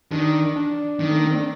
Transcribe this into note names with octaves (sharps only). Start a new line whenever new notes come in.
D#3 D4
D4
D#3
A3
A#3
C4
D4